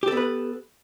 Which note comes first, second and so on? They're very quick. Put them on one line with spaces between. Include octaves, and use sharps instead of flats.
G4 A4 B3 B4